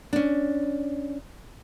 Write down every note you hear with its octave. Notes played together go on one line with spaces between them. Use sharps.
C#4 D4